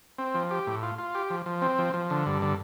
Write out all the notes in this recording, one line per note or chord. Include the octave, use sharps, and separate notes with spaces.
C4
F3
G4
A2
F4
F4
G4
F3
F3
C4
F3
F3
D3
G2
D3